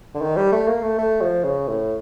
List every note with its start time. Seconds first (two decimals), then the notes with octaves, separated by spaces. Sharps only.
0.15 D3
0.21 D#3
0.37 G3
0.52 A3
0.67 A#3
0.83 A3
0.98 A3
1.21 F3
1.44 C#3
1.68 A2